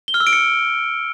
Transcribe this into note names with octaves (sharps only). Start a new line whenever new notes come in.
G7
F6
E6
D7
C#7